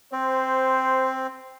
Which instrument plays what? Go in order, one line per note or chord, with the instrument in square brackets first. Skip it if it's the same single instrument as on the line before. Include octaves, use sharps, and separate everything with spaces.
[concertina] C4 [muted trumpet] C5